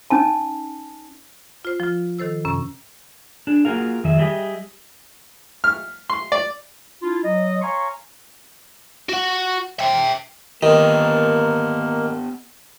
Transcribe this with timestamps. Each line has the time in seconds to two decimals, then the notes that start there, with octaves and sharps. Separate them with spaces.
0.10 C#4 D#4 G#5 A5
1.65 F4 C5
1.80 F3 F4
2.19 D#3 A4 C5 E6
2.45 F#2 C3 C#4
3.47 D4 G#4
3.65 A#3 F4 F#4 G#4 A#4 F5
4.04 F2 D#3 G#4 E5
4.18 F#3 G3 G4 G#4 D#5 E5
5.64 F6
6.10 C6
6.32 D5
7.03 D4 E4 F4
7.24 F#3 D#5
7.62 C#5 F5 G#5 A#5 C6 C#6
9.09 F#4 F#5
9.79 E5 G5
10.63 D#3 A#3 B3 G4 A#4